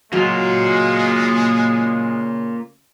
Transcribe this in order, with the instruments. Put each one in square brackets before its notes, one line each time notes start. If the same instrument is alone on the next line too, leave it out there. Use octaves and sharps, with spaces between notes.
[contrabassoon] C#3 [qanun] F#3 [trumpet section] G#3 [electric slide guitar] A#3 F4